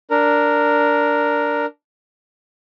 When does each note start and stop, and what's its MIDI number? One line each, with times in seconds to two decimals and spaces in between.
0.11 1.66 62
0.11 1.66 70